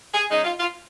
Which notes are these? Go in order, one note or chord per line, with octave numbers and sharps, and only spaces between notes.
G#4
C#3 G#3 D#4
F4
F4